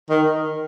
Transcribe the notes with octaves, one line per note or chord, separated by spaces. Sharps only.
D#3